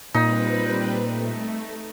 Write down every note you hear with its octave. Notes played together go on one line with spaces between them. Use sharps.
A#2 G3 C4 D#4 B4
A3